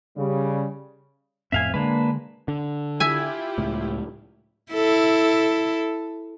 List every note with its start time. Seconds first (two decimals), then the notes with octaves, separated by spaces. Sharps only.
0.17 C#3 G3
1.52 F2 A2 C4 E5 F5 G#5
1.74 D3 G#3 A#3 D4 B4
2.48 D3
3.00 E4 F4 G4 E5 G#5
3.58 C#2 A2
4.73 E4 A4